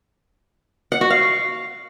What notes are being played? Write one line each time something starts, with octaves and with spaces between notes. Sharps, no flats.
F#5
F#4
F5